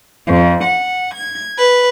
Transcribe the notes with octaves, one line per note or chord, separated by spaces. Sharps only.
F2
F#5
G#6
B4